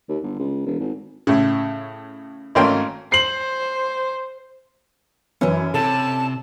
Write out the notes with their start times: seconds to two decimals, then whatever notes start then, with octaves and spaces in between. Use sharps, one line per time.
0.09 D#2
0.23 G1
0.39 C#2
0.66 E1
0.80 G#1
1.27 A2 C#3
2.55 G#1 A3 A#3 C#4 G5 C6
3.12 C5 C7 F#7
5.41 F#2 E3 C#4 D4 E4
5.74 C3 A4 A5